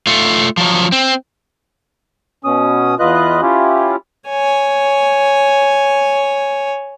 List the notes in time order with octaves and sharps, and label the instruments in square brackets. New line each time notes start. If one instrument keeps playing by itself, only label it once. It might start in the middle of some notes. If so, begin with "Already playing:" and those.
[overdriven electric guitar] A3 F4
F3 F#3
C4
[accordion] B2 C#4 D#6
E2 F4 B4 D#5 F#6
C#4 E4 F4 G4
[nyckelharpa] C#5 G#5